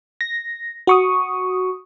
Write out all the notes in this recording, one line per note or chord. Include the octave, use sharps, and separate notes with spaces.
A#6
F#4 C#6 D#6